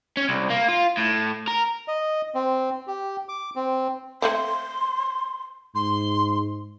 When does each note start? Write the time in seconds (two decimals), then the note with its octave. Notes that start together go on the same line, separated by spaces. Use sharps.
0.17 C#4
0.29 C2
0.50 A#3
0.69 F4
0.97 A2
1.47 A#4
1.88 D#5
2.35 C4
2.87 G4
3.29 D6
3.56 C4
4.22 A3 A#3 C4 C6
5.75 G#2 C6